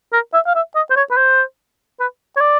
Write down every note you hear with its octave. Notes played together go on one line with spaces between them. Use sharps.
A#4
E5
F5
E5
D#5
C5
C#5
B4
C5
B4
C#5
D5